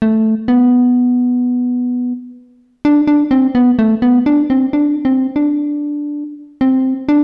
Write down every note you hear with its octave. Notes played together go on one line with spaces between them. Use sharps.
A3
B3
D4
D4
C4
B3
A3
B3
D4
C4
D4
C4
D4
C4
D4